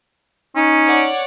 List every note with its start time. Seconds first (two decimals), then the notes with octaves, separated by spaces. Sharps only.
0.56 C#4 D#4
0.87 C#5 D5 F#5